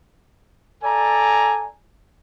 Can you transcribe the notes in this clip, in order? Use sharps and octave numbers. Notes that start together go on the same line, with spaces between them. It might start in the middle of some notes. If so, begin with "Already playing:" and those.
A4 D5 G#5 A#5